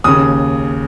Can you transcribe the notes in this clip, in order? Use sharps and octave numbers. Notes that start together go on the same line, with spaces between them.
D#2 C#3 D#6